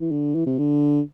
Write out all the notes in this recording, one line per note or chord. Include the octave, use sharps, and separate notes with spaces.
E3
D3
E3
C3
D3